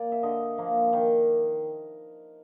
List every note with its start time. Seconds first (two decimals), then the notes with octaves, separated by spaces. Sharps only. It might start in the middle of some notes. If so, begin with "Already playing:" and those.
Already playing: A#3 D5
0.12 E5
0.23 D3 D#5
0.58 F3 A#3
0.93 D#3